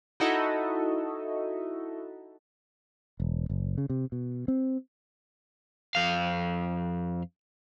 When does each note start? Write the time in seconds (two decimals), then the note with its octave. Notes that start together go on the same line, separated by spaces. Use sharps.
0.20 D#4 E4 F#4 A4 D#5 E5
3.20 E1
3.50 F#1
3.78 C#3
3.90 C3
4.12 B2
4.48 C4
5.95 F2 F5